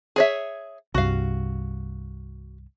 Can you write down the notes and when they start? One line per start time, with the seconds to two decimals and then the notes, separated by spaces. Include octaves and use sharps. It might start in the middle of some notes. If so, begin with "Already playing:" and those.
0.16 G#4 C#5 E5
0.94 C2 G2 F#4 F5